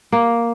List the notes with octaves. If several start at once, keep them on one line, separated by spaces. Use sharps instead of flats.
A#3